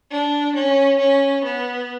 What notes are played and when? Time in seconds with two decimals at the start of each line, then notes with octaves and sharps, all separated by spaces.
0.10 D4
0.55 C#4
0.99 C#4
1.44 B3